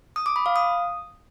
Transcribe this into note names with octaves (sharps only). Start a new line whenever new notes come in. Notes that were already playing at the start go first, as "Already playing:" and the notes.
D#6
D6
B5
F5
D#6